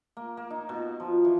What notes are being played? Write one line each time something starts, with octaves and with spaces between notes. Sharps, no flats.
A#3
A#3
D#4
B2
F3
E3